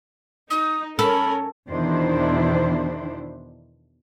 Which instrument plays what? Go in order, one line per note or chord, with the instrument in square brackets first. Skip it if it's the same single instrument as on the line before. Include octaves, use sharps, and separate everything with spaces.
[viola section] D#4 [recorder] D#6
[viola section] C#4 A#4 [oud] A4 [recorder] B5
[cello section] E2 B2 D#3 D4 E4 C5